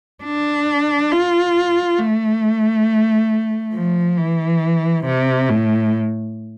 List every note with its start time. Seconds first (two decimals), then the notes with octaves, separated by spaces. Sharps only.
0.24 D4
1.12 F4
1.99 A3
3.74 F3
4.18 E3
5.05 C3
5.49 A2